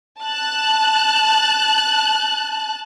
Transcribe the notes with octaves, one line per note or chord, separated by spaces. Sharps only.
A5 F#6